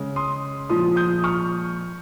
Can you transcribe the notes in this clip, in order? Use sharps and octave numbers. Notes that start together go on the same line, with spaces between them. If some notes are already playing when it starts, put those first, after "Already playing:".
Already playing: C#3 G#3
C6 D#6
A#2 F3 G#3 C6 D#6
D#6 G6
C#6 F6